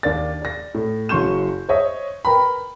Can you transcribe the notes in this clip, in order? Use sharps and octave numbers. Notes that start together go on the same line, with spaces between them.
D#2 A#3 D4 D5 A6
D5 A#6
A2
F#1 F#3 C6 C#6 G6 E7
C5 C#5 D#5 E5
A#4 B4 G5 A#5 B5